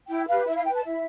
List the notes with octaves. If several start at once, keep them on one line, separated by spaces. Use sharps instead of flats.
E4 G5
G4 B4 F5
E4 E5
F5
B4 G5
A5
E4 E5